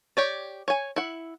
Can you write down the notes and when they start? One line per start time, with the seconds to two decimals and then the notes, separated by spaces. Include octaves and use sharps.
0.17 G4 C#5 D5
0.68 C#5 G#5
0.96 E4 F#5